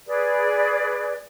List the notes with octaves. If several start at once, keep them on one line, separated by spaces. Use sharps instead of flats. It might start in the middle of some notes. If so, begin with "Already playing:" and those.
G#4 B4 D5